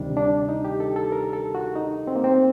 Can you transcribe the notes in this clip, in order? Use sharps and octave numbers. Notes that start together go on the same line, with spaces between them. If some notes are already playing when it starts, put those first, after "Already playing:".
Already playing: D2 C3 D#3 G3 D4
D4
D#4
G4
A4
A4
A#4
A4
F#4
D#4
C4
A#3
C4